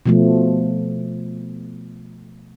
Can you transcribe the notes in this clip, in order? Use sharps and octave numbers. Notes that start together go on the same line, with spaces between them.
B2 F3 A3